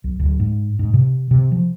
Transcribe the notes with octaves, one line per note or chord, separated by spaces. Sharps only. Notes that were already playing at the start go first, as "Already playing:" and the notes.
B1
D1
G#2
G#2
C3
C3
F3